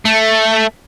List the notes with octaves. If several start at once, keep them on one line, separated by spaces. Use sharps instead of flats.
A3